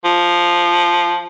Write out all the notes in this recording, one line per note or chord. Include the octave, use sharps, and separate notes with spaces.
F3